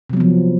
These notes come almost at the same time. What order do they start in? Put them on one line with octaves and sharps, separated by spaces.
C3 F#3 B3 F3